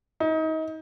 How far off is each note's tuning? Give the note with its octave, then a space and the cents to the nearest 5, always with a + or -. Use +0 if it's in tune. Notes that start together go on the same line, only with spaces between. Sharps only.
D#4 +30